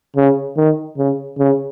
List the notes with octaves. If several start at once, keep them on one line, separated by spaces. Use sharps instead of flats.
C#3
D#3
C#3
C#3